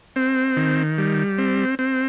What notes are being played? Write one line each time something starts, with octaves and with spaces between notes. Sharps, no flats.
C4
D#3
G3
C4
C4